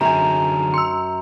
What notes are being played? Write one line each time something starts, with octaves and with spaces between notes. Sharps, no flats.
F#2 D3 D#4 G#4 G#5 A#5 F7
C6 E6